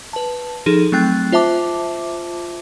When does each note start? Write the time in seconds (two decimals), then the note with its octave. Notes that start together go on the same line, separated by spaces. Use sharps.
0.13 B4 A5
0.66 F3 D#4 G#4 A4
0.92 F#3 A3 C4 G5 F#6 A6
1.32 F4 C5 E5 A5 D6